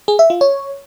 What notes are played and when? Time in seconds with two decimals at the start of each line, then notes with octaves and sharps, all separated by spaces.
0.08 G#4
0.19 E5
0.30 F4
0.41 C#5